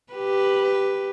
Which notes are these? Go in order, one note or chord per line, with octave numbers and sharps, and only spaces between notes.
G4 B4